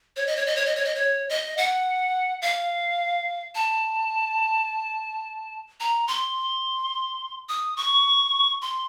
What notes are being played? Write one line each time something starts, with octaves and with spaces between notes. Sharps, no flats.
C#5
D#5
C#5
D#5
C#5
D#5
C#5
D#5
C#5
D#5
F#5
F5
A5
A#5
C6
D#6
C#6
C6